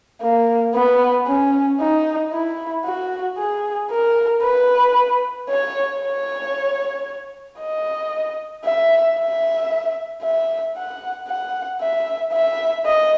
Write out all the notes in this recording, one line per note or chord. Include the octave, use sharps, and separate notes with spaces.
A#3
B3
C#4
D#4
E4
F#4
G#4
A#4
B4
C#5
C#5
D#5
E5
E5
E5
F#5
F#5
E5
E5
D#5